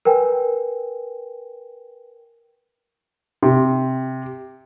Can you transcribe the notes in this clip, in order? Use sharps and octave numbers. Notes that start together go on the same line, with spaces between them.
A#4 B4 G5 G#5
C3